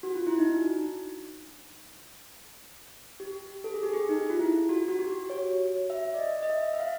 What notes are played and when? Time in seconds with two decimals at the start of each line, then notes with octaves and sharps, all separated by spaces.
0.03 F#4
0.15 F4
0.27 E4
0.38 D#4
0.49 D4
3.20 G4
3.64 A4
3.74 G#4
3.83 G4
3.93 G#4
4.09 D#4
4.30 F4
4.39 E4
4.69 F#4
4.88 F#4
4.99 G4
5.30 C#5
5.90 E5
6.14 D5
6.19 D#5
6.43 D#5
6.50 E5
6.74 E5
6.80 F5